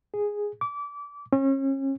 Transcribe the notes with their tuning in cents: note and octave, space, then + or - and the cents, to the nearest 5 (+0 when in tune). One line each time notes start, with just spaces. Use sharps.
G#4 -5
D6 -25
C#4 -35